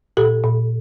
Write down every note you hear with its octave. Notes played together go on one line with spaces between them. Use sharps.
A#2 G4 A4
A#2